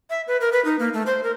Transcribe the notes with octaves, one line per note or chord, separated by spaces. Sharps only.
E5
B4
A#4
B4
D#4
A#3
A3
C5
A#4